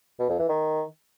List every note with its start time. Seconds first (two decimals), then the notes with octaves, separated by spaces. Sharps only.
0.19 B2
0.29 F2
0.39 E3
0.49 D#3